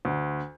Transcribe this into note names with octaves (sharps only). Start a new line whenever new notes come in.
D2